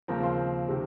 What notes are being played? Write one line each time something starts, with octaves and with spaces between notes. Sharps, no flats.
D#2 C#3 F3 C4 A#4 A#5
C5 C6
C3 D#3